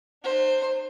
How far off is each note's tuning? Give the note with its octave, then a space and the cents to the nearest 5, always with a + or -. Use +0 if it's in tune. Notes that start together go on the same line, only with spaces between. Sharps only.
D#4 -45 C5 +10